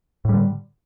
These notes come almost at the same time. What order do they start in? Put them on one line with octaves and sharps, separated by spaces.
A2 G3 D3